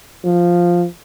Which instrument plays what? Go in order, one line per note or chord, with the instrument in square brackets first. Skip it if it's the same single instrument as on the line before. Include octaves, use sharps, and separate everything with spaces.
[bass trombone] F3